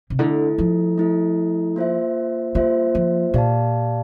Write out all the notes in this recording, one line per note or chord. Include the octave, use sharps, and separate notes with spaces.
C3
D3 A3 E4 A4
F3
A3 E4 A4
A#3 F4 C5 E5
G3 A#3 F4 C5 E5
F3
A#2 G4 D5 F5 A5